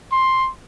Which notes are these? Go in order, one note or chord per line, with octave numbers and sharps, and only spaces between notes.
C6